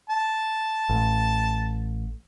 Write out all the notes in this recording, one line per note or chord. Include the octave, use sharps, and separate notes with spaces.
A5
A1